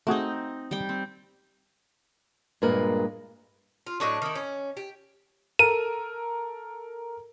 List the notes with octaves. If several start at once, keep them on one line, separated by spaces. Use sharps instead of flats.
A3 C4 D#4 F#4 G#4
G3 G5
C4
G2 A#2 G#3 A#3 A#4 B4
F4
A2 F#3 D4 D#5 C#6 D6
D#3 E4
C#4
G4
A4 A#4 D#7